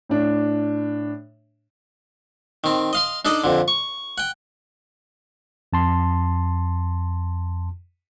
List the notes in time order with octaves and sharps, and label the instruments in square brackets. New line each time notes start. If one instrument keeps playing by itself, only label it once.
[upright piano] A2 D4
[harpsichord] D#3 C4
D#5 F5 C6
D4 D#4 A4 D5 D#5
F2 D3
C#6
F#5 G5
[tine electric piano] F2 A5 C6